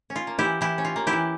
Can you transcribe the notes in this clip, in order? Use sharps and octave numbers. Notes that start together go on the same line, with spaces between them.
C#4
F4
A#3
E4 G4
E3
E3 E4 G4
C#4
F4
A#3
E4 G4
E3